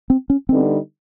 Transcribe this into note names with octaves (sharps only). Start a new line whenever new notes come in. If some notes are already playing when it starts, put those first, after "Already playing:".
C4
C#4
D3 G3 B3 C4 D#4